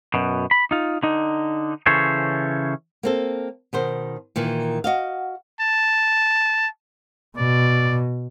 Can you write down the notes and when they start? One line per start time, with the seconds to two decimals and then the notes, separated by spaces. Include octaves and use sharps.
0.14 F#2 B2
0.51 B5
0.71 D#4 F4
1.03 D3 D#4
1.86 C#3 E3 C#4 A4 C5 C#5
3.03 A#3 C4 A4
3.73 B2 D#3 C5
4.36 A#2 D#3 E3
4.84 F#4 D#5 F5
5.61 A5
7.37 B2 D5